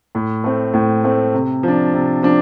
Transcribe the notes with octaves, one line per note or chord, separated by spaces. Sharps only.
A2
A3 C4
A2
A3 C4
C3
F3 D4
C3
F3 D4